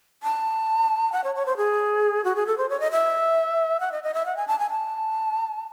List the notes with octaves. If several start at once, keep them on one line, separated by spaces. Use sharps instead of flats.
A5
F#5
C#5
C#5
C5
G#4
F#4
G#4
A4
C5
C#5
D#5
E5
F#5
D#5
D#5
E5
F#5
G#5
A5
G#5
A5